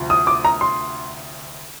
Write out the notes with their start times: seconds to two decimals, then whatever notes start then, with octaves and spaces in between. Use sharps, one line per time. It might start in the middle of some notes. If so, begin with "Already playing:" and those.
Already playing: D2 C3 F3
0.10 D#6
0.27 D6
0.45 A#5
0.61 C6